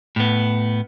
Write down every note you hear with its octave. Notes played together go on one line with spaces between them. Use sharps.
A2 B3